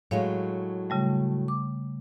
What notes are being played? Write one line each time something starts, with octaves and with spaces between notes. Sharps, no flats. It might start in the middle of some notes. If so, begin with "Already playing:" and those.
A2 F#3 G#3 C#5 F5
C#3 G3 A3
D6